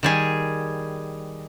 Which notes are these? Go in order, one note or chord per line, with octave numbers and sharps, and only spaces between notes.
D#3 G3 G#4